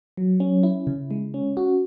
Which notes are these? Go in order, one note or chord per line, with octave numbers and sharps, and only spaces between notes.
F#3
C#4
E4
C#3
G#3
C#4
F#4